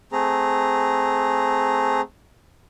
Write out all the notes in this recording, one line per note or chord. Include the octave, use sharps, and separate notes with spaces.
A3 C4 G#4 A#5